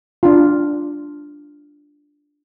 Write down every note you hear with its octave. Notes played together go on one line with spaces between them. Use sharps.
D4 F4